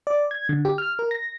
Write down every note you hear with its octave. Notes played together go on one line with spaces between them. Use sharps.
D5
G#6
D3
G4
F6
A#4
A#6